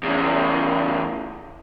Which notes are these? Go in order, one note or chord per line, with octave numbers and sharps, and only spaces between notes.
E2 C#3